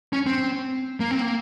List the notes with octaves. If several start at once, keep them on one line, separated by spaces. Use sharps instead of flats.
C#4
C4
A#3
C4
A#3